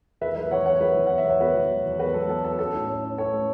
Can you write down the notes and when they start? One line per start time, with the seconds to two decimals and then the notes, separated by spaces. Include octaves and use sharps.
0.21 E2 B4 E5
0.36 F#3 B4 E5
0.51 E2 C#5 F#5
0.66 B3 C#5 F#5
0.81 F#3 B4 E5
0.95 E2
1.06 B3 F#5
1.18 E5
1.25 E2 C#5
1.40 B3 F#4 B4
1.55 E2
1.69 F#3
1.85 E2
1.99 B3 F#4 B4
2.14 F#3 A4
2.29 B3 A4
2.44 B3 A4
2.59 C#4 A4
2.74 A2
2.88 C#4
3.04 C#4
3.18 C#4 A4 C#5
3.33 A3